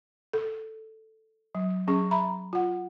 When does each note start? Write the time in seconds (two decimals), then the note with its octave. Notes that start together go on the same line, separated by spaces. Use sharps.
0.33 A4
1.55 F#3
1.88 F#3 C#4 G#4 C#6
2.11 E5 A#5 B5
2.53 F4 F#5